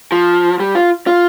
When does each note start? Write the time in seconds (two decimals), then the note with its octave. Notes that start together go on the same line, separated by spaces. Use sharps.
0.12 F3
0.60 G3
0.75 F4
1.07 F4